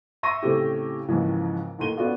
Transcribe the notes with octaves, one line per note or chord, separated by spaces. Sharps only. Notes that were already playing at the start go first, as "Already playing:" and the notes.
E5 C6 C#6 E6 A#6 D#7
A2 C#3 A3 C4 E4 G4
D#2 G#2 C#3 E3 F3
D#2 A2 C6 D#7 G7
B3 C#4 D4 F4 F#4 A4